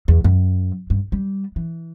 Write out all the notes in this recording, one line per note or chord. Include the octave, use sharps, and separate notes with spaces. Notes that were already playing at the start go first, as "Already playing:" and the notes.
E2
F#2
G2
G3
E3